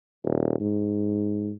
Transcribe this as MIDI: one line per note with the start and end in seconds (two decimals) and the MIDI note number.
0.24 0.56 27
0.60 1.52 44